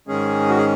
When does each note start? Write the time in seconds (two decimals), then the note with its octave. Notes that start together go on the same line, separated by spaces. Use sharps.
0.08 G#2 D#3 G#3 C#4 G#4
0.49 F#4
0.57 G#4